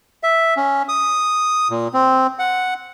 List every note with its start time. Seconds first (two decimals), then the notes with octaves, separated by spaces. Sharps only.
0.23 E5
0.57 C#4
0.89 D#6
1.70 A#2
1.94 C4
2.39 F#5